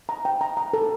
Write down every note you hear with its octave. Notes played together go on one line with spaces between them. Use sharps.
A#5
G5
A#5
A#5
A4